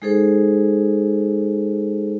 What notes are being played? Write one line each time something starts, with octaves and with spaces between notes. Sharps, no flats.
G#3 D#4 G#4 A4 C5